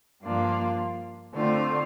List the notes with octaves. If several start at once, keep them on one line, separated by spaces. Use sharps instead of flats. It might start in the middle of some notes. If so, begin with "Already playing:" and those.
G2 F3 A#3 D4 F4
D3 A3 C4 F4